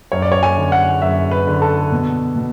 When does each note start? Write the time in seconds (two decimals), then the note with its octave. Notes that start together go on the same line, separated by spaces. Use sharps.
0.12 F#2 C#5
0.22 D5
0.32 C#5
0.43 G#5
0.57 D3
0.72 F#5
1.02 F#2 E5
1.31 B4
1.47 D3
1.62 A4
1.92 B2
2.36 B2